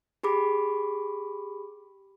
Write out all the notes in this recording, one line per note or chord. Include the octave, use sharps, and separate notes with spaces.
G4 G#4 B5 D6